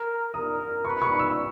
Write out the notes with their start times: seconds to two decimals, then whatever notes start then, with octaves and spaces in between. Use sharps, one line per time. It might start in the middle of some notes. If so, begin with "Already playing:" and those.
Already playing: A#4
0.34 A#4 D#6
0.85 B4 C#6
1.02 C#6
1.19 E6